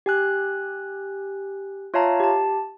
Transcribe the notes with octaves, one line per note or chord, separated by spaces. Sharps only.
G4 G#5 F#6
F4 C#5 E5 F5 A5 A#5
G4 A5